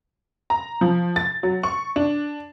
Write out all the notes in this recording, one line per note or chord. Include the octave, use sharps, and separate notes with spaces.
A#5
F3
A6
F#3
C#6
D4